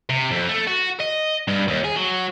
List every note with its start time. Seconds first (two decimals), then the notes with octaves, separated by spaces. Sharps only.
0.09 C3
0.31 F2
0.49 A3
0.67 F#4
1.00 D#5
1.48 G2
1.68 D#2
1.84 G#4
1.96 F#3